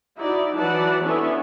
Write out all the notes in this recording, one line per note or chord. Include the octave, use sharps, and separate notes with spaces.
D#4 E4 F#4 D5
E3 F#3 B4 D5 F#5 A5
B3 C#4 D4 E4 A4 E5